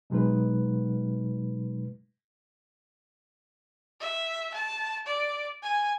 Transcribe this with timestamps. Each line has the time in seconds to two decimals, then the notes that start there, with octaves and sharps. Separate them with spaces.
0.10 B2 F#3 G#3 D#4 B4
4.00 E5
4.54 A5
5.06 D5
5.63 G#5